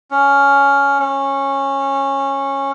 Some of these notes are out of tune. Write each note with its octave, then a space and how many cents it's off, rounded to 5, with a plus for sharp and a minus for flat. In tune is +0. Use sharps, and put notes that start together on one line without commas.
C#4 +10
C#4 -15